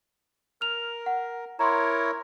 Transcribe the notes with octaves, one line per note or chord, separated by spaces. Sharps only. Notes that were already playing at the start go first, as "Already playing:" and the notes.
A#4 F6 F7
F#5
E4 A#4 C#5 A#5 C6